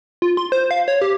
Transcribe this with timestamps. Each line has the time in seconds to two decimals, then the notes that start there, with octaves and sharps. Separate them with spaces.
0.22 F4
0.37 C6
0.52 C5
0.71 F5
0.88 C#5
1.01 G4